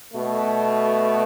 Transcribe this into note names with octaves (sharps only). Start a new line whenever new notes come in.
B2 A3